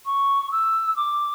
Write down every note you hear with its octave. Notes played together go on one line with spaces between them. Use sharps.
C#6
E6
D6